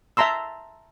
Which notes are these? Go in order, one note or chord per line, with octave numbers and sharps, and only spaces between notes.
E5 A5 A#5 C6 E6